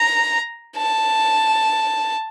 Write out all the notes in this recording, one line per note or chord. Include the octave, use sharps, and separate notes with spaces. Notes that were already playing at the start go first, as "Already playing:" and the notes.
Already playing: A#5
A5